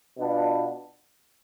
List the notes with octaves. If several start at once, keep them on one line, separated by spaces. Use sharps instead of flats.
B2 B3 D4 F4